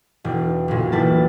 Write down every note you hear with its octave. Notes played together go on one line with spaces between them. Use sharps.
E1
B1 A#2
E1 E4 A5